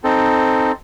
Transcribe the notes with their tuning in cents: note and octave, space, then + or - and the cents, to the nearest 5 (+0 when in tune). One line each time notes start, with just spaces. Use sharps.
C4 +0 D#4 +0 A4 +0